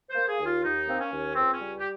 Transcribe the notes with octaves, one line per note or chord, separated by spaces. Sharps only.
C5
A#3
G#4
D#2
F4
D#2 D#4
A#3 C4
C#4
D#2
C#2 C4
C#4
G3
G4